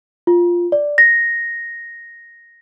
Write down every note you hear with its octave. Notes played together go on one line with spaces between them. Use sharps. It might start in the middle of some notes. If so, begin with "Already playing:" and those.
F4
D5
A#6